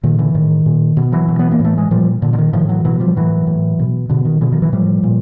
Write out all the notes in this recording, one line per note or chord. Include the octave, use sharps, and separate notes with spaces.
A#2 D#3
D3 E3
A2 D#3
A#2
B2
E3 F#3
B2
B3
A#3
A2
A3
G#3
A#2 F3 G3
A#2 D3
D3
D#3
A2 D#3 F3
E3 F#3
B2 E3 F#3
F3 G3
A2 E3 F#3
A2
B2
B2 D3
D#3
B2 D3 E3
D#3 F3
E3 F#3
A2 F3 G3
A#2